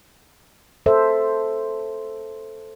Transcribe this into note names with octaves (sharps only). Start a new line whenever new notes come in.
A4 C5 E5